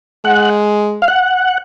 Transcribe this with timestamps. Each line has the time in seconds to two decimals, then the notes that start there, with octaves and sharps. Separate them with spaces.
0.25 G#3 F#5
1.02 F5
1.08 F#5